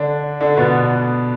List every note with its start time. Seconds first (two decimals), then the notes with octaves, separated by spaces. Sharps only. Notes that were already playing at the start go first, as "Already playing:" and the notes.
Already playing: D3 D4
0.41 D3 D4
0.57 B2 B3